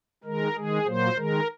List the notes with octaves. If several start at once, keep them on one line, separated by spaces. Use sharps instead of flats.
D#3 G#3 A#4
D#3 G#3 G#4
A#2 F#3 A#3 C5
D#3 G#3 A#4